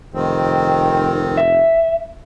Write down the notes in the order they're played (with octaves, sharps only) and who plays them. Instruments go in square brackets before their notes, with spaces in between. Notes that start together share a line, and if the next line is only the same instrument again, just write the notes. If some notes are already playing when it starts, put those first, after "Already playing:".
[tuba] F1 [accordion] D#3 C4
[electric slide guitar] E5